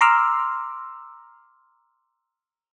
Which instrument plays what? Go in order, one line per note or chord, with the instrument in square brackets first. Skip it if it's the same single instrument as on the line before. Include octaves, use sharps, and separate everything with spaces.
[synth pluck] A#5 C6 D6 E6 F6